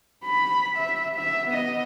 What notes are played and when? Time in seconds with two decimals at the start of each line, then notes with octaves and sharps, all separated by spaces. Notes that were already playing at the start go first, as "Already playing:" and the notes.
0.25 B5
0.77 E5
1.16 E5
1.49 B3 D#5